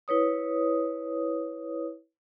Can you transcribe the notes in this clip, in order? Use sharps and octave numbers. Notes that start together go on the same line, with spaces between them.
E4 B4 C#5 D#6